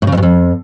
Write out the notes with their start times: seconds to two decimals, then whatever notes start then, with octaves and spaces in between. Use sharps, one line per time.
0.02 A2
0.07 C#3
0.12 F2
0.17 G2
0.22 F2